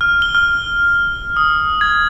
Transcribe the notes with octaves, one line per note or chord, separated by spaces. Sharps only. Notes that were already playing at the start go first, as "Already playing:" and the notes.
F6
G7
F6
D#6
G#6